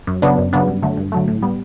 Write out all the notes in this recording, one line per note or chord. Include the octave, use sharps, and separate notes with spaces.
F#2
C#3 F#3 B3 D4
F#2
C#3 F#3 B3 D4
G2
D3 F#3 A3
G2
D3 F#3 A3
A2
G3 B3